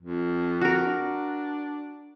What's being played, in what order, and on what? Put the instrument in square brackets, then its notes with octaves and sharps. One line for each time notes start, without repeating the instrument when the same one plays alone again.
[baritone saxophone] F2
[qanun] F#4 A#4
[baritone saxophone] D4